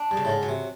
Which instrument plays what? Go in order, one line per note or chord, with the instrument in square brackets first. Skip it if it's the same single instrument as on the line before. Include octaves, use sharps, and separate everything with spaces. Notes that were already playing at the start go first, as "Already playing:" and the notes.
Already playing: [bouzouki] D4
[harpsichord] G2
[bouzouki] C#3
[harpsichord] A2
G#2
[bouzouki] F#3
[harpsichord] C3